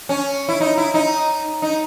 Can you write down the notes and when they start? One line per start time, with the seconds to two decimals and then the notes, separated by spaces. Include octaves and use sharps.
0.09 C#4
0.49 E4
0.61 D#4
0.78 E4
0.94 D#4
1.62 D#4